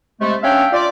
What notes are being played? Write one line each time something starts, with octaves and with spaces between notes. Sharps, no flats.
C3 G#3 A3
C#4 D4 E5 F5 G5
F4 D5